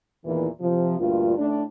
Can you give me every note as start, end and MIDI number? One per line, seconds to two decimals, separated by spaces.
0.25 0.48 40
0.25 0.48 46
0.25 0.48 51
0.25 0.48 52
0.61 0.96 48
0.61 0.96 53
0.99 1.36 38
0.99 1.36 43
0.99 1.36 46
0.99 1.36 65
1.37 1.63 45
1.37 1.63 62